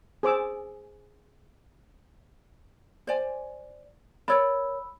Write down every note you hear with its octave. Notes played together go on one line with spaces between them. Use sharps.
G#4 C5 D6 E6
C5 D5 G#5
A#4 C#5 D5 B5 E6